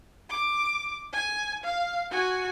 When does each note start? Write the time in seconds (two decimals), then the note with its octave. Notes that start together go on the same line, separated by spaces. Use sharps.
0.29 D6
1.13 G#5
1.63 F5
2.10 F#4 G#5